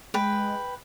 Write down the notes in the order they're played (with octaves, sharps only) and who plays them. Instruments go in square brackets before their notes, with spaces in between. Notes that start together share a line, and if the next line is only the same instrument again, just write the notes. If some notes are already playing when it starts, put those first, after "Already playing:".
[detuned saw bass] G#3 [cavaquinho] B4 G5